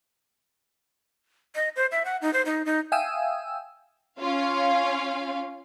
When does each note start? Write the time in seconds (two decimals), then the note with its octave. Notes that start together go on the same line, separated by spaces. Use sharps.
1.55 D#5
1.76 C5
1.92 E5
2.05 F#5
2.22 D#4
2.33 C5
2.45 D#4
2.66 D#4
2.92 E5 F5 G5 G#5 D#6 E6
4.20 C#4 F4 F5